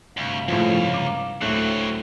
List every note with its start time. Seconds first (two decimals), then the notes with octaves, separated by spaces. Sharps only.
0.17 D2 G2 C3 F5
0.48 C#2 A2 F3
0.94 A#5 D6
1.41 D2 A2 F#3 A3 C4 F#6